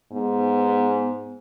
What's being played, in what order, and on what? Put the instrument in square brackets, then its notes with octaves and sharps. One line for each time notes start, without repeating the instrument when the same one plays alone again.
[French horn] G#2 [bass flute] B3